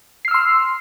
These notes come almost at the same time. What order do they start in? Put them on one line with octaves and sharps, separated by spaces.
C7 F6 E6 C6